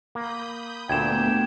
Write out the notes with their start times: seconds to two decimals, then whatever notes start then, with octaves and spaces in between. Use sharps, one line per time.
0.15 A#3 B5 D#6 G6
0.89 D2 A#2 A3 B3 D4 G5 G#6 E7